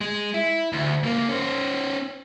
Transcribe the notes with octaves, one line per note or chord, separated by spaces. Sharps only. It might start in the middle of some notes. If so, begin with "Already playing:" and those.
G#3
E4
D2
C#2 A#3
C#4 C5